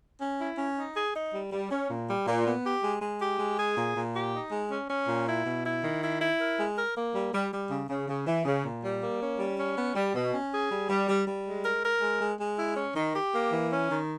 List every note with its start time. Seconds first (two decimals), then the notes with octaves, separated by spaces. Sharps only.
0.21 C#4
0.39 E4
0.58 C#4
0.77 D#4
0.95 G#4
1.14 D#4
1.33 G3
1.52 G3
1.70 C#4
1.89 A#2
2.08 G3
2.27 A#2
2.46 B3
2.65 G4
2.83 G#3
3.01 G#3
3.20 G4
3.39 G#3
3.58 G#4
3.77 A#2
3.95 A#2
4.15 G4
4.33 D#4
4.51 G#3
4.70 C#4
4.89 C#4
5.08 A#2
5.27 E4
5.46 B2
5.64 E4
5.82 D#3
6.02 E4
6.20 E4
6.40 A#4
6.58 G#3
6.76 A#4
6.96 A#3
7.14 G3
7.34 G3
7.52 G3
7.70 C#3
7.89 C#3
8.08 C#3
8.26 E3
8.45 C#3
8.65 A#2
8.83 G3
9.02 A#3
9.20 C#4
9.39 G3
9.58 C#4
9.77 B3
9.95 G3
10.14 B2
10.33 C#4
10.52 G#4
10.71 G3
10.89 G3
11.09 G3
11.27 G3
11.46 G#3
11.64 A#4
11.83 A#4
12.02 G#3
12.21 G#3
12.39 G#3
12.58 E4
12.76 C#4
12.96 D#3
13.14 G4
13.33 A#3
13.52 E3
13.71 C#4
13.90 D#3